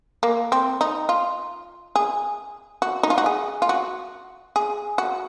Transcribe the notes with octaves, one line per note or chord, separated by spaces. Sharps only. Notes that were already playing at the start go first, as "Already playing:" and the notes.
A#3
C4
D#4
F4
G#4
F#4
D#4
F4
F#4
G#4
F4
F#4
G#4
F#4